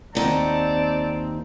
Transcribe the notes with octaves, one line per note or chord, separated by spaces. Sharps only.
D#2 C4 D#4 D5 F#5 A5